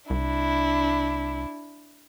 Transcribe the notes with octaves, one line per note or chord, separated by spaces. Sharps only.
C2 D4 E4